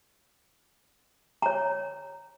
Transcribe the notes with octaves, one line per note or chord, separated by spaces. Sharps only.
C#5 A#5